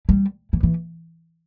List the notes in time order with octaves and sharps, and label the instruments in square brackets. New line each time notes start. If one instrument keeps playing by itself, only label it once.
[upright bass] G3
E3
E3